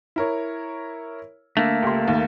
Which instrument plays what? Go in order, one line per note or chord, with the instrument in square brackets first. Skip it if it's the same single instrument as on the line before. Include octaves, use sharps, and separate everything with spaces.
[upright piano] E4 A#4 C#5
[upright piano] D3 [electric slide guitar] A3 A#3
[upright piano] C#2 G4 C6
D#2